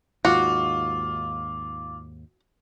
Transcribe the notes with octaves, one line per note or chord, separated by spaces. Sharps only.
D#2 G#2 F4 F#4 D6